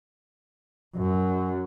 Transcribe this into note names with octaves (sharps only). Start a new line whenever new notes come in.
F#2